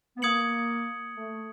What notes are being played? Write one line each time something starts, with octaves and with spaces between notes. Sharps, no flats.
B3
A#3 D#6 G#6 C#7 F#7
A3